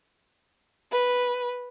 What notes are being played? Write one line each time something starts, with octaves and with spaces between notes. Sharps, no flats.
B4